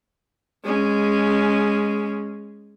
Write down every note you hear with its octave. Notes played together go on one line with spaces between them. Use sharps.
G#3 C#4